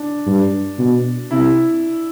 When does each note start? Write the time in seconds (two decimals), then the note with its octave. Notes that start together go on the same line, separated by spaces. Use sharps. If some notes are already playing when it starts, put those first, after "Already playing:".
Already playing: D4
0.27 G2
0.79 B2
1.31 C3 E4